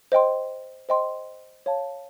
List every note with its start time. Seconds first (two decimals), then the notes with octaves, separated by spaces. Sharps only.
0.12 C5 D#5 G5 C6
0.89 C5 D#5 G5 C6
1.66 C#5 F5 A5